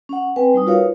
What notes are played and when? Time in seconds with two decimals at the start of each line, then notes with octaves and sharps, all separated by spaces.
0.09 C#4 F#5
0.36 C4 B4 G5 G#5
0.54 G3 D#4 D#6
0.67 F4 F#4 A#4 B4 C#5 F5